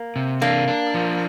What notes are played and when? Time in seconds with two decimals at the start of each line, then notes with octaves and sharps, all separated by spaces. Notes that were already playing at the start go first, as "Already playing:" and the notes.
Already playing: A#3
0.16 C3
0.41 A#3 D4
0.68 D4
0.94 F3